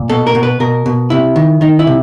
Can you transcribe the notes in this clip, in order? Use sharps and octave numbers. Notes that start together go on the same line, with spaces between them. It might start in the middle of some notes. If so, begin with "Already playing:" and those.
Already playing: A#2
B2 A4
A#4
B2
B4
B2 A#4
B2
C3 E4
D#3
D#3 D#4
E4
C3